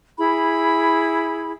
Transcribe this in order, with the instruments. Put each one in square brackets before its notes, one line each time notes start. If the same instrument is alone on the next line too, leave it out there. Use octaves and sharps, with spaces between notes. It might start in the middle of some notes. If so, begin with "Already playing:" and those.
[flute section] E4 G#4 B5